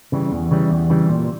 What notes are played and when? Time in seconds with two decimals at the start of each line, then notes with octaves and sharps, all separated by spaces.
0.12 C#3 E3 G3
0.32 E2
0.51 C#3 E3 G3
0.70 E2
0.90 C#3 E3 G3
1.09 A#2